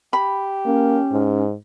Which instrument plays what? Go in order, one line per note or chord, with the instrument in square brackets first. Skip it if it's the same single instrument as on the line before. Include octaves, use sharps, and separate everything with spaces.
[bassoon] G4 [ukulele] B5
[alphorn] A#3 [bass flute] C#4
[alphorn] G#2